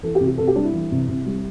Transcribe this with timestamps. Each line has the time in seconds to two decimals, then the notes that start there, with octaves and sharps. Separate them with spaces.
0.03 E3 A4
0.15 G4
0.20 C3
0.27 G4
0.38 C3 A4
0.47 G4
0.55 G3 D4
0.64 E4
0.73 E3
0.91 C3
1.08 C3
1.26 G3